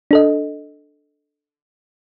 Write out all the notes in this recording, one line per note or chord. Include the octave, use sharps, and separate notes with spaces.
D4 A4 D#5